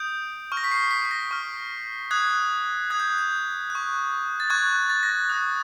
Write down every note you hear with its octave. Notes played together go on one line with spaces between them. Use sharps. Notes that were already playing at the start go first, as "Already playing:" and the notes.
Already playing: D#6 G6 D7
C#6 F6
A#6
B6
C7
B6
B6
A#6
C#6 F6
D#6 F#6 G#6
D#6 F#6 G#6
G6
G6
F#6
C#6
A6
C#6 F#6 G#6
A6
A#6
A6
D#6 F#6 A#6